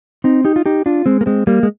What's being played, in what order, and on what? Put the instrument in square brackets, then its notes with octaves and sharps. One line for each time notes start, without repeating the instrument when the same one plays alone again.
[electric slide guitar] C4 D#4
D#4 G4
F4
D#4 G4
D4 F4
G#3 C4
A#3
G#3 C4
G3 A#3
G#3